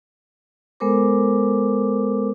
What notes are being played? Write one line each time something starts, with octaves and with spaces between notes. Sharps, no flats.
G#3 B3 A4 A#4 C5 D6